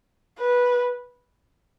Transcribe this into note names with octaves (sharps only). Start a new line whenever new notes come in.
B4